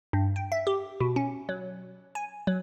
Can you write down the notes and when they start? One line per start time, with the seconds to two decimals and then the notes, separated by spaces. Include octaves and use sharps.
0.13 G2
0.36 G5
0.52 E5
0.67 G4
1.00 B2
1.16 C#4
1.49 F#3
2.15 G#5
2.47 F#3